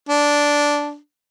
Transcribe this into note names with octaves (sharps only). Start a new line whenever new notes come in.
D4